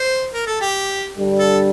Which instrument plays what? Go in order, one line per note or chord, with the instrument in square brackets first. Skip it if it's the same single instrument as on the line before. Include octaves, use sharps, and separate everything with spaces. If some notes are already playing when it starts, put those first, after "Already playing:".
Already playing: [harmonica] C5
A#4
A4
G4
[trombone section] G2 D3 G3
[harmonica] A4